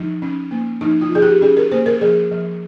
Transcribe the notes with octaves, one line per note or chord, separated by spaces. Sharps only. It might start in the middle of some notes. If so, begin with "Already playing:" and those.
Already playing: F3 D#4
C#4
A#3
F3 D#4
F4
F3 G#4
G4
C#4 G#4
A#4
A#3 C5
A#4
F3 G#4
F3